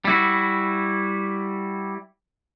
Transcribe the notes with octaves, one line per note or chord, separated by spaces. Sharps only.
G3 E4 F#4